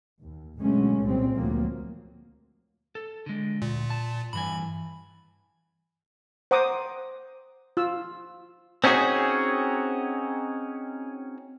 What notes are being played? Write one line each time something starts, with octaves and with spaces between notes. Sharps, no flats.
D#2
B2 D3 F#3 G#3 A3 C#4
C2 A#2 G3 G#3 C4
D2 F3 F#3 A#3
A4
D3 G#3
D2 A#2
A5
G2 E3 G#5 B5
C5 F#5 A#5 D6 D#6
F4 E6
C4 C#4 D#4 F#4 G#4